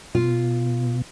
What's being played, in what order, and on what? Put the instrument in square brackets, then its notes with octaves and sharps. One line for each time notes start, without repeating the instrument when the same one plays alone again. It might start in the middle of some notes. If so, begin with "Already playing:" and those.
[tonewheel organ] B2 [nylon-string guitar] F4